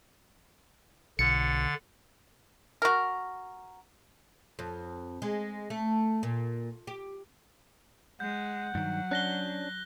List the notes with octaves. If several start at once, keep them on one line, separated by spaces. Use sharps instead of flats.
B1 D3 A6 C#7
F#4 A#4
F2
G#3
A3
A#2
G4
G#3 F#5 G6
G2 D#3 F#3
C#4 D4 F#6 A#6 G7